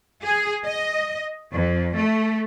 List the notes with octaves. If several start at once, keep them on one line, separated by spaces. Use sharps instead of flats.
G#4
D#5
F2
A3